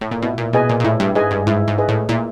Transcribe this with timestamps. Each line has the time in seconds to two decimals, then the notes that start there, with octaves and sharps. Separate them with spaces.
0.01 A2
0.11 A#2
0.22 B2 E4
0.38 A#2
0.53 B2 G#4 B4 D#5 G#5
0.69 A#2
0.80 A#2
0.84 A2 E4
1.00 G2
1.15 G#2 G#4 B4 D#5 G#5
1.31 G2
1.47 G#2 E4
1.68 G#2
1.78 G#4 B4 D#5 G#5
1.89 A2
2.09 A#2 E4